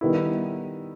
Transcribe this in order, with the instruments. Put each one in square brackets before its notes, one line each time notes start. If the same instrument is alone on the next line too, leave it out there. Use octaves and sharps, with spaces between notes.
[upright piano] D#3 G3 B3 E4